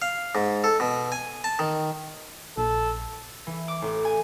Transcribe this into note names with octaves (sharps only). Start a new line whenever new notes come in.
F5
G#2
A4
B2
G#5
A5
D#3
A#1 A4
E3
D6
A1
G#5